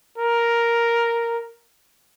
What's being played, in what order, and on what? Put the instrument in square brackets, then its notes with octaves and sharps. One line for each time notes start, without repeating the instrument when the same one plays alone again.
[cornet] A#4